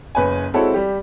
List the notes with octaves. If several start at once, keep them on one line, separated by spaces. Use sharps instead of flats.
F#1 B4 C#5 G#5
G#3 C4 E4 F#4 A4 C#5
G3 G4